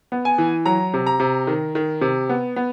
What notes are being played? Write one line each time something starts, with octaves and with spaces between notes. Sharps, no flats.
B3
G#5
E3
F#3 A#5
C3
A#5
C3
D#3
D#3
C3
B3
B3